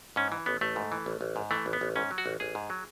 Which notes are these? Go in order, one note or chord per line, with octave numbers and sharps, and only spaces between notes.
G#2 C#4
E3
A1 B3
A1 A3
G#2
E3
A1
A1
G#2
E3 A3
A1
B3
A1
G#2 C#4
F#3
F#4
A1
A1 G#4
G#2
F#3